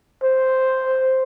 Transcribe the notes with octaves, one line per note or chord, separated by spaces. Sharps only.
C5